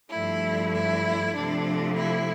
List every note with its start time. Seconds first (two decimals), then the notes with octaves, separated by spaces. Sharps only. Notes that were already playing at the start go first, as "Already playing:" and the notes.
0.11 G2 F3 A3 E4
0.74 E4
1.35 C3 F3 A3 D4
1.97 E4